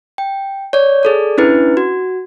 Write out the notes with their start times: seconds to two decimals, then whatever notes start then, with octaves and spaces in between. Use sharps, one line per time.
0.18 G5
0.73 C#5 D5
1.03 G#4 A4 D5
1.38 C#4 D4 E4 B4
1.77 F#4